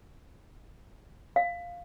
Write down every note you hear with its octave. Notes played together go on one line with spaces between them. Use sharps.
F5